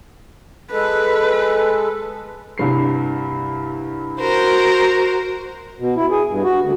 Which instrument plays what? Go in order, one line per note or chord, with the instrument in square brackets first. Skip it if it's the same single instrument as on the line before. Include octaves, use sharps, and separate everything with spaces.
[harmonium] G#3 A4 [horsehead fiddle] B4
[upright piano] C2 G2 C7
[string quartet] F#4 A#4 C5
[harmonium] B2
E4
G#4
G2
F#4
D2